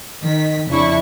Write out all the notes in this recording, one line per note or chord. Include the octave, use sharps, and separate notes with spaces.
D#3 B6
F2 C#3 D4 E4 C#6